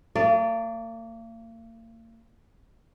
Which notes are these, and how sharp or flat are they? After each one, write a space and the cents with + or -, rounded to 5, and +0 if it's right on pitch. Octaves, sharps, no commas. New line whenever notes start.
A#3 -40 D5 +0